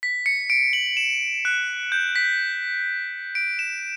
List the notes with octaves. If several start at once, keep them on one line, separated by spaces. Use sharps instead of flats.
B6
C#7
D7
F#7
E7
F#6
G6
B6
D7
E7